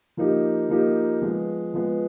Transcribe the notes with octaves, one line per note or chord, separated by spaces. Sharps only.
F3 A#3 D#4 G4
F3 A#3 D#4 G4
F3 G#3 B3
F3 G#3 B3